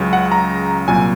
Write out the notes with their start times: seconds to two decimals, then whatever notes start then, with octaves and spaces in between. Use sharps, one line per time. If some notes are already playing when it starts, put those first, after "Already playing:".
Already playing: C#2 C#3 F#3
0.13 F#5
0.32 A#5
0.88 C2 A#2 F#3 G#5